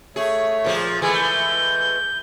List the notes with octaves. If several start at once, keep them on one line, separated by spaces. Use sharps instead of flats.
A3 G#4 C#5
A#2 F3 G#4
E3 G#3 A3 G#4
G6